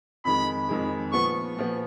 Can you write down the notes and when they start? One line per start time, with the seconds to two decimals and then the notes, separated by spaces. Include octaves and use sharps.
0.25 F2 D#3 G#3 B5
0.69 F2 D#3 G#3
1.12 A#2 F3 B3 C#6
1.57 A#2 F3 B3